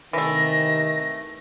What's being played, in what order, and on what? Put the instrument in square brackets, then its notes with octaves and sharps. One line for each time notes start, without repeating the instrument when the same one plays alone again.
[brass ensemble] C3 D#3 [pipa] E3 A3 [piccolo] A#6